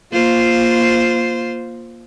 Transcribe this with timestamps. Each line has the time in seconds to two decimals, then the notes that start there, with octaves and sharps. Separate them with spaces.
0.12 A#3 F4 C5